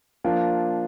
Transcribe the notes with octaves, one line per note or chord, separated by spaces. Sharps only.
F3 A#3 D4 F4